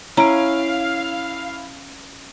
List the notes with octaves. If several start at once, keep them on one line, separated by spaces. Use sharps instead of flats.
C#4 E4 F5 A#5 D7